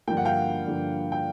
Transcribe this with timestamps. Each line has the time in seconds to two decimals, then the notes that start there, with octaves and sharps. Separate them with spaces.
0.07 G2 D3 F3 A#3 G5
0.17 F#5
0.25 F5 G5
0.66 G2 D3 F3 A#3
1.12 G5